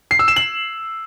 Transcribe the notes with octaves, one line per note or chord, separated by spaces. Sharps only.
C7
E6
E7
F#7